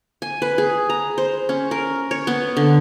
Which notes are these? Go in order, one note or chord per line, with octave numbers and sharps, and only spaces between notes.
G#5
B4
G#4
A#5
C5
C#4
A#4
C#5
B3
D3